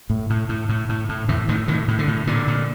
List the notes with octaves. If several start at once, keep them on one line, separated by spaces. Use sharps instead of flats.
A2
A2
A2
A2
A2
A2
E2 A2 E3
A2 D#3
A2 D#3
A2
D3
A2
A#2 D3
A#2